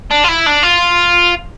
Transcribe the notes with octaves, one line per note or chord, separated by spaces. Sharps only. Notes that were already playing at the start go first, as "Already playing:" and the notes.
D4
F4
E4
D4
F4